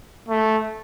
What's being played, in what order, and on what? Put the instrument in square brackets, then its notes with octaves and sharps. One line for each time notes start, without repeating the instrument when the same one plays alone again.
[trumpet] A3